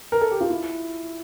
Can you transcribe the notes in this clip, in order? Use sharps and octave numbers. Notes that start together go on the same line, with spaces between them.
A#4
A4
G4
F4
E4